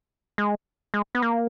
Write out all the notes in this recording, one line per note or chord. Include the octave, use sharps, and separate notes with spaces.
G#3
G#3
B3
A#3